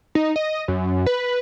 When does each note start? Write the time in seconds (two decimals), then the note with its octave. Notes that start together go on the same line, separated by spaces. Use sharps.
0.15 D#4
0.36 D#5
0.68 F#2
1.06 B4